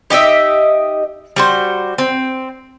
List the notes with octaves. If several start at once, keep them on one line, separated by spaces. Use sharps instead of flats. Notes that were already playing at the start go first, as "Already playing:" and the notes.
D#4 G4 D#5 E5
G3 F#4 C5
C4